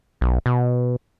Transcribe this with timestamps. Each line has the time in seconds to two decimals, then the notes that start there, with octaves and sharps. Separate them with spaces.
0.21 B1
0.46 B2